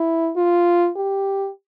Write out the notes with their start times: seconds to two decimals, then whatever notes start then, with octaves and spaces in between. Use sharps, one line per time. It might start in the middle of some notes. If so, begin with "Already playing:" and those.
Already playing: E4
0.36 F4
0.96 G4